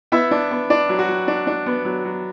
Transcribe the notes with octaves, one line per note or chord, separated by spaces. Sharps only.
B3 E4 E5
D4
B3
D4 D5
F#3
F#4
F#3
D4
D4
B3
F#3
F#3